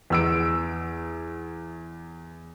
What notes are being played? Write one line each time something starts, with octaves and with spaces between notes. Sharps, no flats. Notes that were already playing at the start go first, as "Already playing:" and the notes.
E2 E6 D7